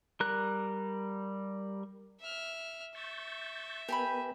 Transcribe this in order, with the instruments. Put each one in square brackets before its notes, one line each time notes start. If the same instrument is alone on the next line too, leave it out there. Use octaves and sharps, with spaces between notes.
[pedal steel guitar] G3 A#4 F#6
[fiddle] E5 F6
[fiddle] E5 [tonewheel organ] C#6 G6 A6
[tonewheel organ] B3 A#4 B4 [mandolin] G4 G#5 B5